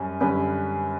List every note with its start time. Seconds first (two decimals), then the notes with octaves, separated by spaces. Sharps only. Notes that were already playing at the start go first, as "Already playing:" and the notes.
Already playing: F#2 G3 C#4
0.21 F#2 D3 G3 C#4 B4